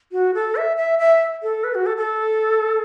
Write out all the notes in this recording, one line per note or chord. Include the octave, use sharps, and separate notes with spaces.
F#4
A4
E5
E5
E5
A4
B4
F#4
A4
A4